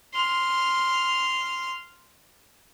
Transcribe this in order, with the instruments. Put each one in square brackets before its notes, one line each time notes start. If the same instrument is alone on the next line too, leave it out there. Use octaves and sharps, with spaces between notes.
[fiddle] C6 F6